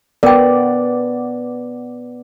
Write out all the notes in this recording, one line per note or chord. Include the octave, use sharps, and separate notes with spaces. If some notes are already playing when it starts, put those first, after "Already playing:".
B3 A#4 D5 G5